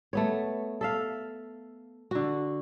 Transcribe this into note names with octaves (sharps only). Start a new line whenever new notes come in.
A3 B3 C#5
A4 E5 F5
D3 F#4